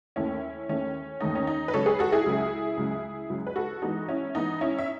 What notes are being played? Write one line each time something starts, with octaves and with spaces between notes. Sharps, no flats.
D#2 D#3 A3 C#4 E4
D#2 D#3 A3 C#4
D#2 D#3 A3 D#4
C#4
D#4
B4
C#2 C#3 F#3 A4 C#5
G#4 B4
F#4 A4
E4 G#4
C#2 C#3 F#3
C#2 C#3 F#3
C#2 C#3 F#3
B4
F#4 A4
G#2 E3 B3 D#4 F#4
C#4 E4
G#2 E3 B3 D#4
C#4 E4
E5